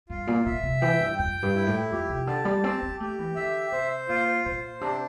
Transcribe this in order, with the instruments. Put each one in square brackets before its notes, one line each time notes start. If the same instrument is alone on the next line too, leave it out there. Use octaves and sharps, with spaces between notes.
[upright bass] G2 [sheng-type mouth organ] F4
[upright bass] A#2
[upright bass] A#2 [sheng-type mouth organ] E5
[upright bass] C3
[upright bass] E3 [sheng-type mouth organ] G5
[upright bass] G2
[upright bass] F2 [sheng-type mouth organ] G5
[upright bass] G2
[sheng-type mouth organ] E4
[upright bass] A2
[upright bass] F2 [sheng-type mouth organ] G4
[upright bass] C3
[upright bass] D3 [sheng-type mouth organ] A5
[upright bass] G3
[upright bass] C4 [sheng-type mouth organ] G4
[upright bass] C4
[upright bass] A3 [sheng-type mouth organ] G4
[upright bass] E3
[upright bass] D3 [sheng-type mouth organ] E5
[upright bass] C3 [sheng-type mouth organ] C5
[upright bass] A#2 [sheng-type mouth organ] F4
[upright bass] A#2 [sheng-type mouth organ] C5
[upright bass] C3 [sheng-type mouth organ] D4